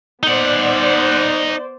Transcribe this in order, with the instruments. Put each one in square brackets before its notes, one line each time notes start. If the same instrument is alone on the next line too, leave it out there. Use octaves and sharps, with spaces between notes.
[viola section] B3 C5 D5 [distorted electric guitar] D#4 F#5